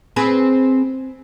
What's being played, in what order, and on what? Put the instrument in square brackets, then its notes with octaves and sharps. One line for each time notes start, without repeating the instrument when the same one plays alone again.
[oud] C4 G#4 B4